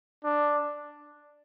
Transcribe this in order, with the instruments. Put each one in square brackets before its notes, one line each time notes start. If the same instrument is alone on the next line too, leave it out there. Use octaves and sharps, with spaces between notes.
[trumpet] D4